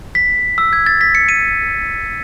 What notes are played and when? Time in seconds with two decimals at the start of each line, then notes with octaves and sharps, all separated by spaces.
0.15 B6
0.58 E6
0.73 G#6
0.86 A6
1.01 B6
1.15 C#7
1.29 D#7